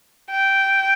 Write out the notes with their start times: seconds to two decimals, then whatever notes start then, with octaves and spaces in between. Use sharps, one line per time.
0.31 G5